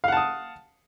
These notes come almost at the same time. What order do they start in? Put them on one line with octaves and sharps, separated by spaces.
F5 F#5 A5 D#6